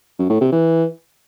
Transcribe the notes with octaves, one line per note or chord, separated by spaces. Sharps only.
F#2
A2
C3
E3